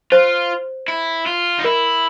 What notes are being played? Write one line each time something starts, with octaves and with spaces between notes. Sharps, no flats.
F4 C5
E4
F4
D#4
E4 A#4